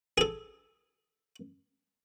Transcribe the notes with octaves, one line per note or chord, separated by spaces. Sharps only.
G#4 A4